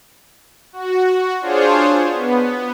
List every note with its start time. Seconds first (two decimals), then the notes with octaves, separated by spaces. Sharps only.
0.73 F#4
1.41 D4 F4 G#4 C5 C#5
2.12 B3